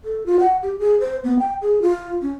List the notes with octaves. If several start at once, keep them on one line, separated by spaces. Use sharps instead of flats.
A4
F4
F#5
G4
G#4
C5
B3
G5
G#4
F4
C#4